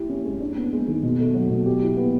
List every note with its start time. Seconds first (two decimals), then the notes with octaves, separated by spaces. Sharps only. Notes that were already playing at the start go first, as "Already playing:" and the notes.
Already playing: E4 G4
0.09 C#4
0.25 G#3
0.40 D4
0.57 B3
0.73 G#3
0.88 D#3
1.03 B2
1.20 A3
1.34 F#3
1.50 B2
1.66 G4
1.82 E4
1.97 B3